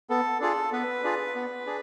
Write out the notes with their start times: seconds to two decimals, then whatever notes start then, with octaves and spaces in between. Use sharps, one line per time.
0.10 B3 A4
0.41 D4 F4 G#4 A4
0.72 B3 B4
1.03 D4 F4 G#4
1.35 B3
1.67 D4 G#4